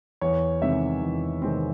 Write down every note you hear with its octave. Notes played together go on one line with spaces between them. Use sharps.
E2 C#5
C3 D#3 G#3 C4 E5
E2
C3 D#3 G#3 C4